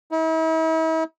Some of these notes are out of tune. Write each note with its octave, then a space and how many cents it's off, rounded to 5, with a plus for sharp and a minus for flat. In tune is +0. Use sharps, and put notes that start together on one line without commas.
E4 -45